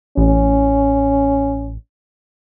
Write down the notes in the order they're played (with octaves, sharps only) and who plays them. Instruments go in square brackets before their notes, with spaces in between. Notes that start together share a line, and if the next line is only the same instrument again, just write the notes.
[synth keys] A1 [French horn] C#4